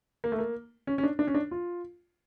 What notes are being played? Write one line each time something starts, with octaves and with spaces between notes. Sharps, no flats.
A#3
A3
A#3
C#4
C#4
D4
D4
C#4
D4
F4